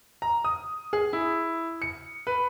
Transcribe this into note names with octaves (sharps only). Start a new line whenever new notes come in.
A#5
D#6
G#4
E4
C#7
B4